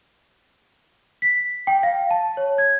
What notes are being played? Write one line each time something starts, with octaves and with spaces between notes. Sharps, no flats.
B6
G5
F5
A5
C#5
G#6